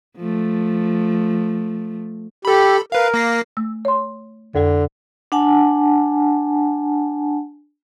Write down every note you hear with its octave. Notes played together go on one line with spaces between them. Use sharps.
F3 A3
G4 A4 B5
A#4 B4 F5
A#3 A#6 C7
A3 E6
C#5 C6
F2 D3 A4
D4 F#5 G#5 A5